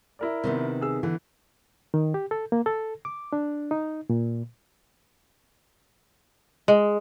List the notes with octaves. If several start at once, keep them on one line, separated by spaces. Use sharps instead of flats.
E4 A#4 D5
C3 D#3 B3
G#4 E6
D3 E3
D#3
G4
A4
A#3
A4
D6
D4
D#4
A#2
G#3